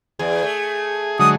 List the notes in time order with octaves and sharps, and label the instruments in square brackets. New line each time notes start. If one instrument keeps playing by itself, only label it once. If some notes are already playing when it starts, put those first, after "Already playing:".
[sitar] E2 [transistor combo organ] G#4
[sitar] A3
[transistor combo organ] D3 F#3 G#3 [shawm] D#6